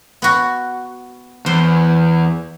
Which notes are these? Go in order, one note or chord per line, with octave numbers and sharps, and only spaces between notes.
B3 F#4
E2 C5